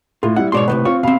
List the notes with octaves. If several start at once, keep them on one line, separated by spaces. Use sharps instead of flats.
A2 F4
G3 E4 F#5
G#2 B2 C#5 D5 C6
D2 A2 C3 B4
C4 F4 C#5
B2 C4 F5 B5